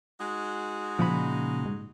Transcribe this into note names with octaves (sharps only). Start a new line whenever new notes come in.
G#3 D#4 F#4
A#2 C#3 F3 B5
G#2